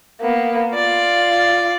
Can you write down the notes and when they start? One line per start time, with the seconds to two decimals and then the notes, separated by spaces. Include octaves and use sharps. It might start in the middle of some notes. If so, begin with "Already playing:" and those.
0.21 A#3 B3
0.74 F4 D5